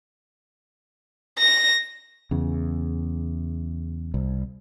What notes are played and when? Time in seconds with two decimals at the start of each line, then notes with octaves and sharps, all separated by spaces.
1.38 A#6
2.31 E2 C#3
4.14 C2